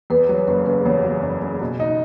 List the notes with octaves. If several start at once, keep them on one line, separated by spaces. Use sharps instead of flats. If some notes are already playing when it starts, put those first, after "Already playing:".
E2 B4
F#3 C#5
F#1 B4
C#3 B4
E2 C#5
F#3
F#1
C#3
B2
D#4